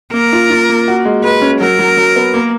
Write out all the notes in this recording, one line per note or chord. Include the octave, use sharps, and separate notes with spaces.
A#3 A#4
F4
F4
A#3
F#4
G#3
G#3 B4
C#4
F#3 A#4
F#3
F#3
B3
A#3